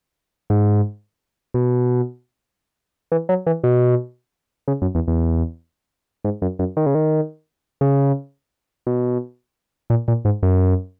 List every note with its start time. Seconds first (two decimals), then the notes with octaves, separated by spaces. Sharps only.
0.50 G#2
1.54 B2
3.12 E3
3.29 F#3
3.47 E3
3.64 B2
4.68 C#3
4.82 F#2
4.95 E2
5.08 E2
6.24 G#2
6.42 F#2
6.59 F#2
6.77 D#3
6.86 C#3
6.95 D#3
7.81 C#3
8.87 B2
9.90 A#2
10.08 A#2
10.25 G#2
10.43 F#2